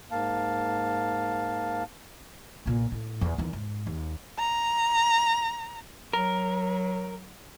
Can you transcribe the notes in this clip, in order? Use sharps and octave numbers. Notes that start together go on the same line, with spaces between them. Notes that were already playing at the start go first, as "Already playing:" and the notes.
G#2 A#3 F5 A5
B1 A#2
A2
E2
E2 D#3
G#2
D#2
A#5
F#3 A#4